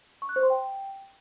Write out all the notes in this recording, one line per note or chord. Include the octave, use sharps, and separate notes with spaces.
C#6
F#6
C5
C6
G5